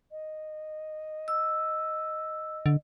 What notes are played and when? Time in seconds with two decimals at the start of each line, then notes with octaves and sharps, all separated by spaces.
0.11 D#5
1.28 E6
2.66 D3